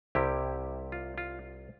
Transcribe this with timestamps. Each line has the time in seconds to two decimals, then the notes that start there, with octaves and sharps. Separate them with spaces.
0.15 C2 C3 G3 E4 G4
0.92 F4
1.18 F4